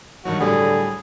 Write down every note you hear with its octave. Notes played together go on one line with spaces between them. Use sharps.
G2 D#3 F#3 F#4
A2 D3 F#3 G3 G#4